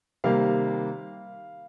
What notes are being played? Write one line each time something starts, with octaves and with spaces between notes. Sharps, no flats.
C3 D#3 G3 A#3 F5